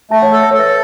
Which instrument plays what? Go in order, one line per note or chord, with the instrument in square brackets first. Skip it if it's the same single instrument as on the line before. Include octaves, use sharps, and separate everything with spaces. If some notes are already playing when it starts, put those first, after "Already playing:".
[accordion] A3 [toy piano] E5 A5
[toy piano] C#5 F#5
[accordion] A4
[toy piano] E5
[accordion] A4 [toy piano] C#5
[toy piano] B4 E5